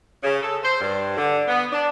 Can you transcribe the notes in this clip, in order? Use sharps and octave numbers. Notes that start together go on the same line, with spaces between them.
C#3
A4
C5
G2
D3
B3
D4